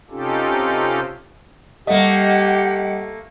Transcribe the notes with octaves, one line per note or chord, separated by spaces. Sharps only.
C3 C#4 D#4 F4 G4 A4
G3 A3 A#3 G4 D#5 F#5